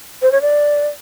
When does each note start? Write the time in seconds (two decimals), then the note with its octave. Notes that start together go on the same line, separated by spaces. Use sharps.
0.22 C5
0.32 C#5
0.42 D5